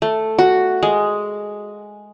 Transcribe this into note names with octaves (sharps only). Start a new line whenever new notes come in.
A3
F#4
G#3